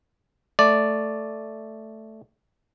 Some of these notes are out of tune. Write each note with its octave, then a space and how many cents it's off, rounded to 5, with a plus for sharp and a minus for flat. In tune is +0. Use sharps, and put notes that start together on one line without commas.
A3 +0 D5 +0